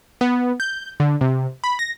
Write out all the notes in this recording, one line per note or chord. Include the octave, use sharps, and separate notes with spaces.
B3
G6
D3
C3
B5
A#6